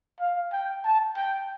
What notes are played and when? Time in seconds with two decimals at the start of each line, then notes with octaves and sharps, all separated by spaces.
0.20 F5
0.52 G5
0.84 A5
1.16 G5